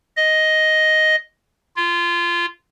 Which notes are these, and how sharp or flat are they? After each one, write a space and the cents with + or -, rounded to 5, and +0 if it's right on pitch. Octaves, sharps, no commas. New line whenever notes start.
D#5 +5
F4 -20